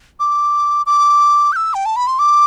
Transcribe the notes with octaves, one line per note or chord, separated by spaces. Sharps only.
D6
D6
G6
E6
G5
A5
B5
C6
D6